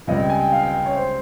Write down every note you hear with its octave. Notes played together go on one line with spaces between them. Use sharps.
C#2 C3 G3 D#5
G5
G#5
G5
F5
G5
C#5
C5